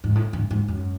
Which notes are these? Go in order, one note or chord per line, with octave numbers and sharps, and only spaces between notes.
G#2
A2
G2
G#2
F#2